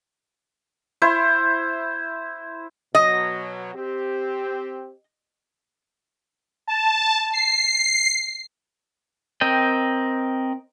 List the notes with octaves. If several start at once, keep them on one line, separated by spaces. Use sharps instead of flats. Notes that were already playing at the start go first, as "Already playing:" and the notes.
E4 C5
B2 F#3 D#5
C4 G4
A5
C7
C4 A#4 D#5 G5